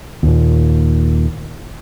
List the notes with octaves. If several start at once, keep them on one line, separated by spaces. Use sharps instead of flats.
D#2 A#2